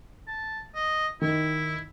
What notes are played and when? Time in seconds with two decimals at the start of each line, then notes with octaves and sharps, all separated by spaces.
0.27 A5
0.75 D#5
1.22 D#3 E4